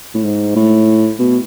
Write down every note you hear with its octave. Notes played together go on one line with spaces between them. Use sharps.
A2
G#2
A2
B2